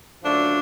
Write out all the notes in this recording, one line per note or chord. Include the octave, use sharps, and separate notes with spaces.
F#2 D3 F3 A3 D4